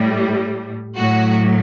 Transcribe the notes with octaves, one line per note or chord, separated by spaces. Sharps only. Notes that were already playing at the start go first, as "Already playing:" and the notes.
Already playing: A2 G3
A2 F#3 F#4